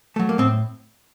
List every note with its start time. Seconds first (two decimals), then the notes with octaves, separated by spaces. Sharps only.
0.16 F#3 A3
0.29 A#3
0.38 A2 C4